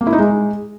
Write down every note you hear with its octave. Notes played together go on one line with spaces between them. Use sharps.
A#3
E4
D#4
G#3